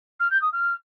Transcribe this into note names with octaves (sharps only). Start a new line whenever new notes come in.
F6
G6
D#6
F6